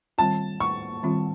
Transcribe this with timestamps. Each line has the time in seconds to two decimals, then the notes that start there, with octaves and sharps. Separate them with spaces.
0.18 D#3 G3 C4 F4 A5
0.60 C#6
1.03 D#3 G3 C4 F4